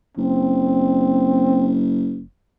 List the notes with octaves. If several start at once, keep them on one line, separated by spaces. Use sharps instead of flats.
F#1 C4